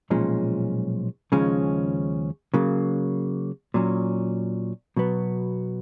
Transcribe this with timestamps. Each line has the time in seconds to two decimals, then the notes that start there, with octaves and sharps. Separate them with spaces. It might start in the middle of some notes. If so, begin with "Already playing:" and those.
0.10 B1 A#2 F3 G#3 C#4
1.32 D#2 C#3 F3 G#3 C#4
2.54 C#3 F#3 A#3
3.74 A#2 F#3 C#4
4.97 B2 F#3 B3